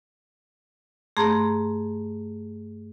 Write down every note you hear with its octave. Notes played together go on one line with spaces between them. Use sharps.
G2 A3 G#4 A#5 C6